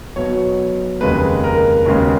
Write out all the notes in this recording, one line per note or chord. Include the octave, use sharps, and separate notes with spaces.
B1 B2 F#3 B3 C#5
F1 D#2 C#3 G#3 B4
A#4
D#2 C#3 G#3 B3